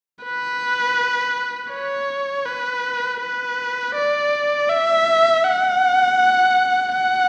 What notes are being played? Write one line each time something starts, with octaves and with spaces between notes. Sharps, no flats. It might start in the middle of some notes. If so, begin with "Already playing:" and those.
B4
C#5
B4
B4
D5
E5
F#5
F#5